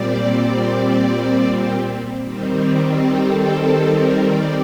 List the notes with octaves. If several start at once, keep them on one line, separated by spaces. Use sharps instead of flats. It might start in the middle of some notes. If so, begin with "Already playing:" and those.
Already playing: A#2 G3 C4 D5
D#3 G3 C4
G4
A4
A4
A#4
D5